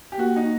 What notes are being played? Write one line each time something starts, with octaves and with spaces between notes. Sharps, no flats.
G4
A#3 F#4
D#4